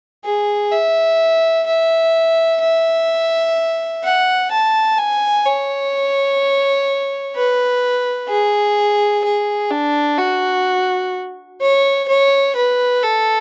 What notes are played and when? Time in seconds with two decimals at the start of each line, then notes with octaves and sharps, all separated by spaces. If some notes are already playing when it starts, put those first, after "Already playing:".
0.25 G#4
0.72 E5
1.67 E5
2.62 E5
4.03 F#5
4.51 A5
4.98 G#5
5.45 C#5
7.35 B4
8.29 G#4
9.25 G#4
9.71 D4
10.18 F#4
11.61 C#5
12.08 C#5
12.56 B4
13.03 A4